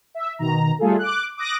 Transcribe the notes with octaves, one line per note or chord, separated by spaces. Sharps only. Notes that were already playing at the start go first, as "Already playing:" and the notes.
E5
B2 D#3 A#5
G3 A3 F4 G#4 A4
D6 F#6
D6 D#6 F#6 A#6